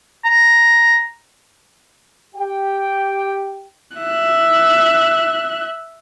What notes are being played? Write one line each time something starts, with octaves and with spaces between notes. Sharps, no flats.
A#5
G4 G5
E5 F#6